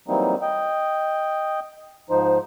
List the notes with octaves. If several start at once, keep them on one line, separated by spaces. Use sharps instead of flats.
E3 F#3 G3 A#3 C4 D#4
D#5 G5
G#2 F3 D#4 C5